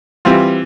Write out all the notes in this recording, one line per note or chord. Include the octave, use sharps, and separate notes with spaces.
E3 G3 C4 F4